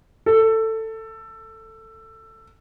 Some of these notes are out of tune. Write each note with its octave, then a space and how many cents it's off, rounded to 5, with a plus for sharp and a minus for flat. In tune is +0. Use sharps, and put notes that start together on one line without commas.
A4 +15